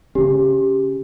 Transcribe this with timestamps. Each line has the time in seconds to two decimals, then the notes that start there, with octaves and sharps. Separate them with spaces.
0.15 C#3 C#4 G4